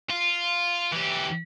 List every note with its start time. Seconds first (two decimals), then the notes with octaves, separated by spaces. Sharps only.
0.10 F4
0.92 E3 G4